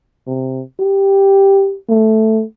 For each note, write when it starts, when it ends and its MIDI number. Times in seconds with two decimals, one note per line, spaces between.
0.27 0.62 48
0.80 1.76 67
1.90 2.43 57